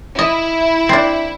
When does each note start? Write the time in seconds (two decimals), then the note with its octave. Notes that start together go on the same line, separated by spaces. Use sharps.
0.19 E4 D#5
0.89 C4 D4